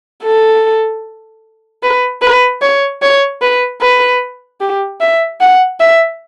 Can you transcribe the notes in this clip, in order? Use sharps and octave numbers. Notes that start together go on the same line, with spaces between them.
A4
B4
B4
C#5
C#5
B4
B4
G4
E5
F#5
E5